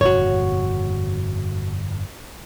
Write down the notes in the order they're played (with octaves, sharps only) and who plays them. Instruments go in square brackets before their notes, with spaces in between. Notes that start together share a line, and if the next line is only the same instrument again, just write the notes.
[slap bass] G1 F2 A#2 [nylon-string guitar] F#4 C#5